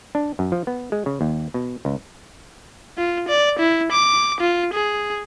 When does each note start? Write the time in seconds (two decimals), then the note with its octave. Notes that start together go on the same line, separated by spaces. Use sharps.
0.15 D4
0.39 F#2
0.52 F3
0.67 B3
0.92 G#3
1.06 C#3
1.21 D#2
1.54 B2
1.85 C#2
2.98 F4
3.29 D5
3.59 E4
3.92 D6
4.41 F4
4.74 G#4